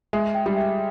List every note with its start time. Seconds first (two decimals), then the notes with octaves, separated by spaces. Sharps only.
0.13 G#3 E5
0.35 G5
0.46 G3
0.57 E5